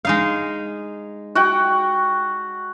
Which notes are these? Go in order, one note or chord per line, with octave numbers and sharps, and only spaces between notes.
G#3 D#4 F5
F#4 F#5 G5